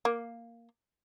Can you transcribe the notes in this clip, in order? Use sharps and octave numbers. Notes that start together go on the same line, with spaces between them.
A#3